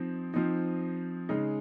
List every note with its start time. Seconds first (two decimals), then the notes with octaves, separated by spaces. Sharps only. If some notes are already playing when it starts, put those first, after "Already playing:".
Already playing: F3 C4 D#4
0.34 F3 C4 D#4
1.29 C#3 G#3 D#4